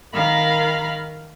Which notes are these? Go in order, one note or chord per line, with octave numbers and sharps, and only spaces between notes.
D#3 A#4 F5 B5 F6